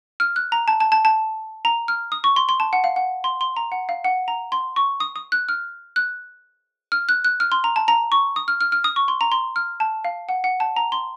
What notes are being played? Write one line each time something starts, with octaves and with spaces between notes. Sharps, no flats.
F6
F#6
A#5
A5
A5
A5
A5
A#5
F6
D#6
C#6
C6
C6
A5
F#5
F5
F#5
C6
C6
A#5
F#5
F5
F#5
A#5
C6
C#6
D#6
D#6
F#6
F6
F#6
F6
F#6
F#6
F6
C6
A#5
A5
A#5
C#6
D#6
F6
F6
F6
D#6
C#6
C6
A#5
C6
F6
A5
F5
F#5
F#5
A5
A#5
C6